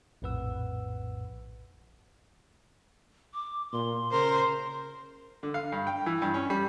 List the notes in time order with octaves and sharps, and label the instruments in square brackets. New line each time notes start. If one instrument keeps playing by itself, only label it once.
[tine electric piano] A#1 F2 A2 B4 F#5 E6
[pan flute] D6
[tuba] A#2 [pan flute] C6
[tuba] C#3 [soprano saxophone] A#4 [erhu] C5
[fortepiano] D3
F5
G2
G5
E3
G2
C#4
G3